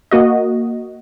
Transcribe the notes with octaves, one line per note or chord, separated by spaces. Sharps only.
A#3 F#4 D#5